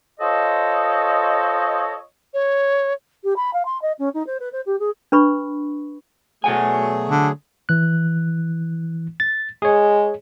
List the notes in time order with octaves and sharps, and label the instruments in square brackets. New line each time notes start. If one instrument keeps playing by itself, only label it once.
[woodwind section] F4 A4 C5 C#5 D#5
[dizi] C#5
[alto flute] G4
B5
F5
C6
D#5
C#4
D#4
C5
B4
C5
G4
G#4
[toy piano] D4 B4 B5 C#6
[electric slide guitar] B2 F#5 G#5 [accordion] F#3 A3 G#4
[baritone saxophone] D3
[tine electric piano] E3 F#6
A6
[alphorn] G#3 [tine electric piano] G#4 C#5